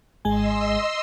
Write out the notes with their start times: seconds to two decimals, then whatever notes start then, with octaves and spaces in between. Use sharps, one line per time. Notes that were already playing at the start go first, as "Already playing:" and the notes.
0.25 G#1 G#3 D#5 G#5 C6 E6